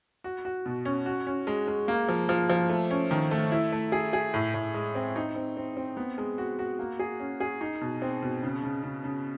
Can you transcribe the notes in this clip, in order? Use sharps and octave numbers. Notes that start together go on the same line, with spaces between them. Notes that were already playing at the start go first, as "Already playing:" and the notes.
F#4
F#4
B2
C#4
F#4
C#4
G#3
G#3
A#3
F3
F3
F3
A3
C#4
D#3
A3
E4
A3
G#4
G#4
A2
A2
G#3
C4
D#4
C4
C4
C4
B3
G#3
F#4
F#4
A#3
G#4
C#4
G#4
D#4
B2
C4
B2
C#3
C#3
C#3
C#3